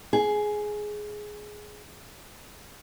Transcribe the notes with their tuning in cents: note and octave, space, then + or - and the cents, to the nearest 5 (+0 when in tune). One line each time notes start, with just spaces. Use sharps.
G#4 +10